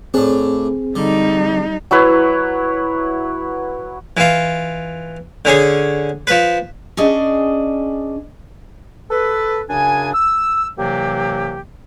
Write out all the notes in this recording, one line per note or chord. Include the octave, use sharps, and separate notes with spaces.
A2 C4 D4 G#4
D3 G3 D#4
F#3 E4 B4 C#5
E3 F4
D3 C#4 G#4
F3 B4
C#4 D4 G#4 D5 D#5
A4 B4
F#2 C#3 D4 G#5
E6
C2 C3 E3 F#3 A#3 G4